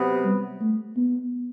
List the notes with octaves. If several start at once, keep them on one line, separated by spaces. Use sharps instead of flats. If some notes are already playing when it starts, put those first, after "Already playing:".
Already playing: C3 F#3 B3
G3
A3
B3